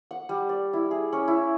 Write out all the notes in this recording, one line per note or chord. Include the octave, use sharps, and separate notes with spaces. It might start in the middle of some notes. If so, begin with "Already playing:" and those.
F#5
G3
D5
E4
G#4
C#4
E4